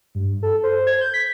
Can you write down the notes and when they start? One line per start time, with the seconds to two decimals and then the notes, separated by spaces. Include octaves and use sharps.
0.15 G2
0.43 A4
0.63 C5
0.87 G#6
1.01 G6
1.14 B6